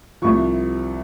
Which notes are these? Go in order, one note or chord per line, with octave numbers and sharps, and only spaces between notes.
C2 C3 F3 C#6